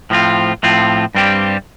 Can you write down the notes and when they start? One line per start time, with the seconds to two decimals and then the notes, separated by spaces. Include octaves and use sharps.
0.10 A2 F3 C4 F4
0.63 A2 F3 C4 F4
1.15 G2 G3 C4 G4